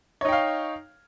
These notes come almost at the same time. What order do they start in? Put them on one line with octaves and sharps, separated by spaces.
C#5 D#4 G5 F5